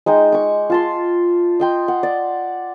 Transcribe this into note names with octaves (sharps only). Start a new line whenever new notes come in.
G#3 D#4 G5
C#6 D6
F4 A5 C6
D#5 G5 C6
F#5
D5